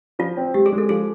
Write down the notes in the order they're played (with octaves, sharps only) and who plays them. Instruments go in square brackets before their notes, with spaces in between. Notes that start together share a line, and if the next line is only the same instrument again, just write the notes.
[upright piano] F3 [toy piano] F4
[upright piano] C4
[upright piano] G#3 [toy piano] G4
[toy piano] G#4
[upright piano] G#3
[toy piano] A4
[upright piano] F3 [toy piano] G#4